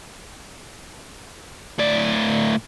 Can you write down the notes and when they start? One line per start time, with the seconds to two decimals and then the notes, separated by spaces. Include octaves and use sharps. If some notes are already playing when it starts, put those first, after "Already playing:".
1.79 A2 D5